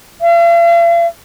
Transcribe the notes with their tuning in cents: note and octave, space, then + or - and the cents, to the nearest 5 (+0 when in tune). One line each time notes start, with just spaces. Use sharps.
F5 -45